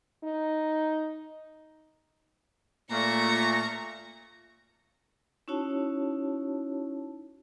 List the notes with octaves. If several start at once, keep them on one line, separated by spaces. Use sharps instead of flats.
D#4
A#2 A3 A#5 C#6
C#4 D#4 E4 F#4 C#5 A5